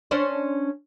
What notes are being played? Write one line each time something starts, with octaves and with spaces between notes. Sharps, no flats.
C#4 D4 C5